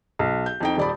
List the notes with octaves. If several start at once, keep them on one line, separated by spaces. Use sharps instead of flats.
B1
G6
F2 D#4 G5
D#1 D5 B5